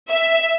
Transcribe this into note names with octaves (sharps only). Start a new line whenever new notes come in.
E5